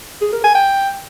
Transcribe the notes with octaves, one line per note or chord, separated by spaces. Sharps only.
G#4
A#4
G#5
G5